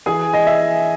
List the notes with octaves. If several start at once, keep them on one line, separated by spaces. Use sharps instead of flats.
E3 G#4 G#5
D#5
E5